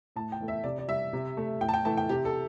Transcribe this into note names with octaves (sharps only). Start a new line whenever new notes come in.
A2 A5
G5
E3 A3
E5
C3 D5
D5
G3 E5
C3
A3
A2 G5
A5
G5
E3 A3 A5
G5
C3 G4
A4